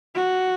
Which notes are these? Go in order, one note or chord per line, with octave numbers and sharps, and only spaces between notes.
F#4